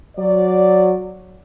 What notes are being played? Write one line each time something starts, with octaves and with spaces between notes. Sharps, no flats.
F#3 D5